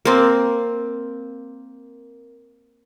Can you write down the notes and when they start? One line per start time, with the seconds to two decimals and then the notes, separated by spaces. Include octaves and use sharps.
0.05 A#3 C4